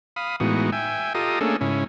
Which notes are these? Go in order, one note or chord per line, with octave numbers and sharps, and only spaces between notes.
F5 B5 D#6
A2 E3 G#3 B3 D#4 F#4
E5 G5 G#5
F4 G4 A4 D#5 A#5 D#6
A3 A#3 C#4 D4 G#4 A4
G#2 C#3 C#4 E4